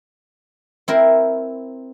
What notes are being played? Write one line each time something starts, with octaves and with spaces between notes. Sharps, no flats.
C4 E4 A#4 C5